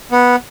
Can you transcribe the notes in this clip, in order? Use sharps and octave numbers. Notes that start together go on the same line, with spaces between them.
B3